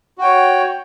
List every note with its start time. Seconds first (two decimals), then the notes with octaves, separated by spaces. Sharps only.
0.18 F#4
0.21 G5
0.24 C#5